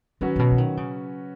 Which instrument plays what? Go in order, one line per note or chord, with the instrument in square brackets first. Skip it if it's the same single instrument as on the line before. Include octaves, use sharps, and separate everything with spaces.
[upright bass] D#3 [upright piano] F#3 C#4 F#4 B4
[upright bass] A#2
B2
E3
D#3
C#3